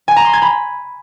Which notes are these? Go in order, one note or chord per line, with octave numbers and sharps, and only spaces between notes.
G#5
A#5
C6
G#6
B5